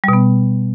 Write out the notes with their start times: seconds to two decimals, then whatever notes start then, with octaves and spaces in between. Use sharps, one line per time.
0.04 G3
0.08 B2
0.13 B3